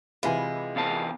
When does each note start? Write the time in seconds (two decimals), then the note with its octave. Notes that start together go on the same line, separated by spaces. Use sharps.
0.23 C3 E3 G#3 F4 E5 G#5 B5
0.76 E2 F5 A5